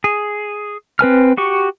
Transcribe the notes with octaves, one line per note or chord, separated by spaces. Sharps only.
G#4
C4 B4 G#5 F6
F#4 G4 C#6